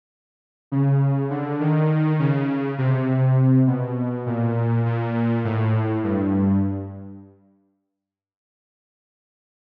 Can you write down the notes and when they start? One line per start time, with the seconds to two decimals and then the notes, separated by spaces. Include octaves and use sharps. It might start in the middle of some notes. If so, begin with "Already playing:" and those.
0.72 C#3
1.30 D3
1.60 D#3
2.19 C#3
2.78 C3
3.67 B2
4.26 A#2
4.86 A#2
5.45 A2
6.04 G2